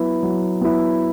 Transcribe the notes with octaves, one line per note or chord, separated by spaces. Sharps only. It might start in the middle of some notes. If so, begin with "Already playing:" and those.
Already playing: F#3 B3 E4
F#3
B3 E4